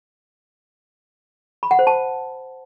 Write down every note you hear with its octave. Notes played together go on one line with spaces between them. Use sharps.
B5
F#5
C5
A5